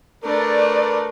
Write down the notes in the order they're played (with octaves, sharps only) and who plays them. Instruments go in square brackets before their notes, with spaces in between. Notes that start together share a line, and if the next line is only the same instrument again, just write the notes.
[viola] A3 D4 [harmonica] A#4 B4 [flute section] D5